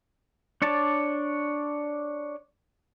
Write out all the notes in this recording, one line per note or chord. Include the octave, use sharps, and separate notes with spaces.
D4 C#5 D5 A5